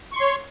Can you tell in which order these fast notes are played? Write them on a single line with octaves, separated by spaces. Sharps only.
C#6 C6 C#5